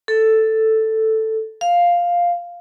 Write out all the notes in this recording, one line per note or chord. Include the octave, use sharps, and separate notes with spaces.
A4
F5